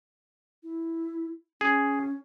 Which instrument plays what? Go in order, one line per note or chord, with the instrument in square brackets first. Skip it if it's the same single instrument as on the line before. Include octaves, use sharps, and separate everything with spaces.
[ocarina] E4
[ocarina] C#4 [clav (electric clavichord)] G#4